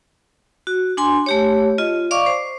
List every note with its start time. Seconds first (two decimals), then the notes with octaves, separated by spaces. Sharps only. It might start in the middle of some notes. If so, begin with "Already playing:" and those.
0.67 F#4
0.97 D4 G#5 C6
1.26 A3 G4 C#5
1.78 F4 D#5
2.11 D5 F5 C#6 D6
2.26 C5